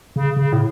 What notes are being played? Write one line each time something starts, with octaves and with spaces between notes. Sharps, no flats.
C#3
C#3
A2